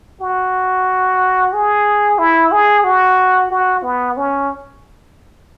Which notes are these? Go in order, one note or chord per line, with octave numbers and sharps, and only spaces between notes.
F#4
G#4
E4
G#4
F#4
F#4
B3
C#4